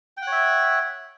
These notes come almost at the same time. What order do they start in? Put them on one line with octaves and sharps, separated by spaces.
G5 F#5 C#5 E5